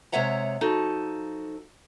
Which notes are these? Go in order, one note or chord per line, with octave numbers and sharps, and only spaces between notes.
C3 G#3 C#5 E5 F#5 A#5
F3 D#4 F#4 A4